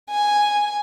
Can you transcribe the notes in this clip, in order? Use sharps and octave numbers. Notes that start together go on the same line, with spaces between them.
G#5